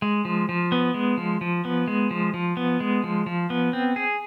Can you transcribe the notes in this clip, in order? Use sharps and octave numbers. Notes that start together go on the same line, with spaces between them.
G#3
F3
F3
B3
G#3
F3
F3
B3
G#3
F3
F3
B3
G#3
F3
F3
B3
C4
G#4